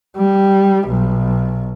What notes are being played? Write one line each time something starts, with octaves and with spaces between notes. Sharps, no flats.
G3
B1